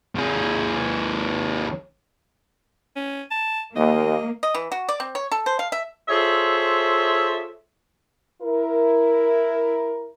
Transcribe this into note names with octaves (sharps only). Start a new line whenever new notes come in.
D#2 G#4
C#4
A5
D#2 A#3 D#5
D#5
E3
F#4
D5
C4
C#5
A4
C5
F5
E5
F4 G#4 A4 C5 C#5 E5
E4 A#4